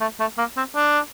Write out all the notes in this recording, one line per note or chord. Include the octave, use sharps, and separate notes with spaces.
A3
A3
A#3
C4
D4